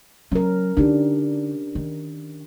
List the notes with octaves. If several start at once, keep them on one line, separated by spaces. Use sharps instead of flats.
F#3 C#4 A#4
D3 D4 D#4 G4
D#3